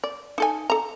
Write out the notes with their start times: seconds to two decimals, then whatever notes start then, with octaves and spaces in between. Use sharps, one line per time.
0.04 D5
0.38 D#4 A4 G#5
0.70 A4 A#5